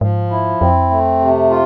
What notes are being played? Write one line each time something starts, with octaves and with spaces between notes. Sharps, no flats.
G#2 F3
E4
F2 C4
A3
C3
F4